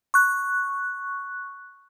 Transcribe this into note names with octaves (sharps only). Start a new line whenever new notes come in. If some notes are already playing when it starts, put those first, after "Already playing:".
C#6 F#6